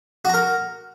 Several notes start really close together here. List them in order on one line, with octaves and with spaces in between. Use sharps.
F#4 A#5 A#4